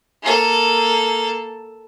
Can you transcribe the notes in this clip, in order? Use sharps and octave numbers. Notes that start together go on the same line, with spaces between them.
A#3 A4